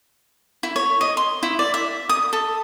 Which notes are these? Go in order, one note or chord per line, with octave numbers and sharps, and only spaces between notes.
E4
C#5
D#5
C6
E4
D5
E5
D#6
A4